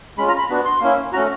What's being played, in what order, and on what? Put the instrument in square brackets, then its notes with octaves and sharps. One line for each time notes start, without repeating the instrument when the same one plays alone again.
[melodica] G#3 C#4 F4 B5
A#5
B5
B3 D4 F#4
C6
A#3 C#4 E4
A3 C#4 F#4 A#5